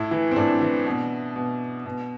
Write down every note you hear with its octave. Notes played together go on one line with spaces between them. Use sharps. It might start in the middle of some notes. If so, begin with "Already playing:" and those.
Already playing: A2 E4
E3
C4
A2 D4
E3
B2
B2
B2